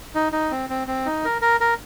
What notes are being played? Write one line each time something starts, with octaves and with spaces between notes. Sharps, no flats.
D#4
D#4
C4
C4
C4
D#4
A#4
A#4
A#4